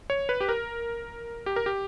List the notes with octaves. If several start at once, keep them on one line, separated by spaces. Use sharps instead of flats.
C#5
B4
G4
A#4
G4
A#4
G4